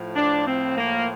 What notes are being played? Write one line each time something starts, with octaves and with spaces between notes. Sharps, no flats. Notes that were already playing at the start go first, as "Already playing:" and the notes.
Already playing: A2 F3
D4
C4
A#3